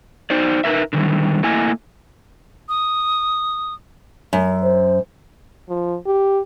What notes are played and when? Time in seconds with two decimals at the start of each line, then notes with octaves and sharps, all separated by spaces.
0.30 D#4 C5 D5
0.64 D#4 A#4 B4 E5
0.93 D3 D#3 G3
1.43 A3 A#3 E4 D#5 G#5
2.69 D#6
4.33 F#2
4.63 C5
5.69 F3
6.07 G4